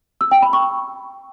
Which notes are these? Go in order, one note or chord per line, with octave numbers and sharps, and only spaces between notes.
E6
G5
B5
C#6